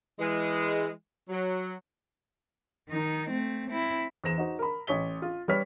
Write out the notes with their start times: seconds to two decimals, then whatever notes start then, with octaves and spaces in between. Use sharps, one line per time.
0.19 E3 G#3
1.29 F#3
2.89 D#3 D#4
3.30 A3 C4
3.70 C4 E4
4.24 E2 C5 A#6 E7
4.38 D#4 F#4 C5
4.59 A#4 B5
4.87 A1 C#5 B6 G7
5.22 F4
5.48 G3 G4 B4 C#5 F6 B6